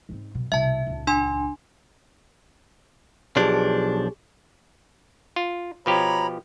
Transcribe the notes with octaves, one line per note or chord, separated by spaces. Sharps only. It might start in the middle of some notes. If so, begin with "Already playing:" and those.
G#2 C4
B2 F#3
C2 B2 E5 A5
D#1 C#2
D4 G#5 C6
B1 F3 D4 G4 G#4
F4
B2 F3 G4 C#5 A#5 B5